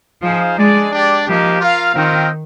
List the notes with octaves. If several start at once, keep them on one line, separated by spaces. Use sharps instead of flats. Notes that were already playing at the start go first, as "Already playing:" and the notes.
F3 D#4 G#4 C5 F5
G#3 D4 G#4 D5
D4 G4 D5
F3 A#3 D#4 G4
F4 A#4 F5
D#3 C4 F4 A#4 D#5 G5